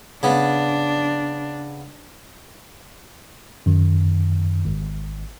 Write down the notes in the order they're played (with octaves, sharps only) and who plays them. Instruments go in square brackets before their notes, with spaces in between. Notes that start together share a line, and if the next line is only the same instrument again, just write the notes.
[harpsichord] C#3 B3 [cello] D4
[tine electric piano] F#2 D#3
G#1